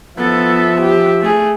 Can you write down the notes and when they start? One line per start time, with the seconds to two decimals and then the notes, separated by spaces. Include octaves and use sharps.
0.18 F3 B3 A4 E5
0.82 G4
1.22 A3 G#4